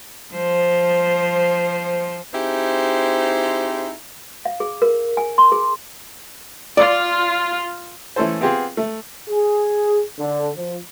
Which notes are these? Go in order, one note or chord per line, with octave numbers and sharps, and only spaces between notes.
F3 C5
C4 D#4 E4 G4 G#4 C5
F5
G#4
A#4
G#5
C6
G#4
F4 D5
E3 A3 C#4 A4 C5
B3 C4 F4 G4 G#4
A3
G#4
D3
F3